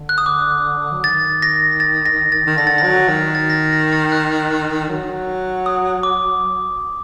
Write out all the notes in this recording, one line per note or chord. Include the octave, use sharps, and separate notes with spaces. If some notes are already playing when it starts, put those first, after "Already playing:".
Already playing: D3
F#6
D#6
D6
F#3
D#3 A6
A#6
A6
A#6
A6
D#3
D3 A#6
A6
F#3 A#6
D#3
A6
A#6
A6
A#6
A6
F#6
F#3
D#6
D6